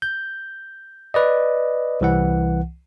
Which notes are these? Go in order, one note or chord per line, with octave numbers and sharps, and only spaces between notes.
G6
B4 D5 D#5
C2 E3 F#5